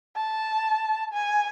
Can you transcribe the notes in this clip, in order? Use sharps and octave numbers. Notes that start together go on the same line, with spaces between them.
A5
G#5